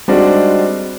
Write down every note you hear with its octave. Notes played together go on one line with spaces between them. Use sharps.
G3 G#3 C4 D4 D#4 F#4